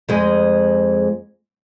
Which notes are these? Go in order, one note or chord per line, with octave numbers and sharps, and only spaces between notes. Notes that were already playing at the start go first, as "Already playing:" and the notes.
F2 G#3